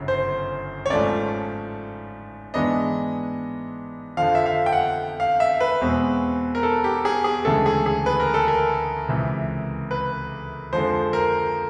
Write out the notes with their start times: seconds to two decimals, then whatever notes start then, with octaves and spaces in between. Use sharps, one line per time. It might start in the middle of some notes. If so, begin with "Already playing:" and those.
Already playing: G1 F#2 C#3
0.08 C5
0.86 C#5
0.90 G#2 F3 A3 C#4 D5
2.54 G#2 E3 G#3 B3 D4 D#5
4.17 F2 D3 F3 F5
4.35 E5
4.46 F5
4.66 G5
4.72 F#5
5.20 F5
5.40 E5
5.61 B4
5.81 E2 B2 G#3 C4
6.55 A#4
6.63 A4
6.84 G4
7.05 G#4
7.24 G#4
7.45 D2 C#3 E3 G#3 A4
7.66 G#4
7.86 G#4
8.06 B4
8.20 A#4
8.34 A4
8.48 A#4
9.09 C#2 C3 E3
9.91 B4
10.73 F2 D3 F3 G#3 C5
11.13 A#4